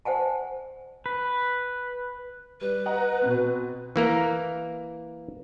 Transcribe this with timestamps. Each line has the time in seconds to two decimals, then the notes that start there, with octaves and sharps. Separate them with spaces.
0.05 C5 F#5 G#5 A5
1.06 B4
2.61 G3 B4
2.86 D#5 F#5 A#5
3.22 B2 C4
3.96 E3 A#3 A#4